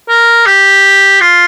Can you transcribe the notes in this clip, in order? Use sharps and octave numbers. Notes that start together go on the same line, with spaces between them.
A#4
G4
F4